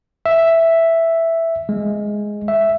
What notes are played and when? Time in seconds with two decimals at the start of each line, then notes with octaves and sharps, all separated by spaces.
0.26 E5
1.69 G#3
2.48 E5